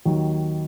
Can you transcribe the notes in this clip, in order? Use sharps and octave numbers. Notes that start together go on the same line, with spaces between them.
D#2 D#3 F#3